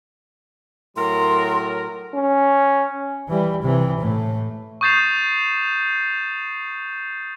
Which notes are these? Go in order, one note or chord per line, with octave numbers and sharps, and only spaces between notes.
A2 F#3 A#4 C6
C#4
E3 G3
C3 E3
A2 A3
C#6 D#6 G6 A6 C7 E7